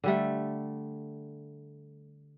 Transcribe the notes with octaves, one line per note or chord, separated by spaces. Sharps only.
D3 G3 A3